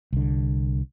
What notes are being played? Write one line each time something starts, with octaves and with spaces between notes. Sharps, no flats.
C2 D3